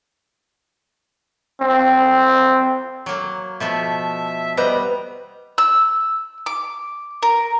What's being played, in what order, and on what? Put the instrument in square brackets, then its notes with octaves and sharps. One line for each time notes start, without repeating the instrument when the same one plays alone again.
[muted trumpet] C4
[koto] F#3 A#3
[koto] B2 F3 A3 [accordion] E5
[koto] G3 A#5 [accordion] B3 [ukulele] B4 C5 D#5
[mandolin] E6
D6
A#4